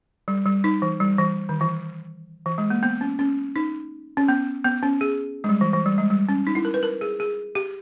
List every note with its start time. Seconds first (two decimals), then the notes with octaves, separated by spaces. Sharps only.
0.28 G3
0.46 G3
0.64 D#4
0.82 E3
1.00 G3
1.19 E3
1.49 D#3
1.61 E3
2.46 E3
2.58 G#3
2.70 A#3
2.83 B3
3.01 C#4
3.19 C#4
3.56 D#4
4.17 C#4
4.28 B3
4.64 B3
4.83 C#4
5.01 G#4
5.44 G#3
5.49 G3
5.61 E3
5.73 E3
5.86 G3
5.98 G#3
6.10 G3
6.29 C#4
6.47 D#4
6.55 E4
6.65 A#4
6.74 B4
6.83 A#4
7.01 G#4
7.20 G#4
7.55 G4